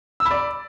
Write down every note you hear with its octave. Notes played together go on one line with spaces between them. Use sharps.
E6
B5
D5